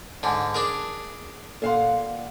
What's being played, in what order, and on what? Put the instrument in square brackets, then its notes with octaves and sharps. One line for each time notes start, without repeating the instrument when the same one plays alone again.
[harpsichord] G#2 D3 [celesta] G#5 A5
[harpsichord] D4 G#4 A#4
[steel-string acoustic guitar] A#2 F5 F#5 [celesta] A4 C6